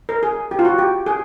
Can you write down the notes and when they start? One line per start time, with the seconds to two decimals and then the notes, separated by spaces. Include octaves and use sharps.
0.09 A#4
0.23 G#4
0.51 G4
0.59 F4
0.65 F#4
0.78 G4
1.06 G#4